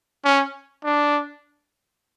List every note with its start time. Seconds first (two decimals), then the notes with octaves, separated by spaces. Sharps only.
0.25 C#4
0.85 D4